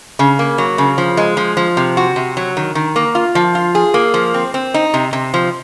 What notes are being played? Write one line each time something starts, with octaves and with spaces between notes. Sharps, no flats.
C#3
A#3
F#3
C#3
F3
G#3
F3
F3
C3
F#4
C3
F#3
D#3
D#3
A#3
F4
F3
F4
G#4
A#3
F3
C4
C4
D#4
C3
C3
F3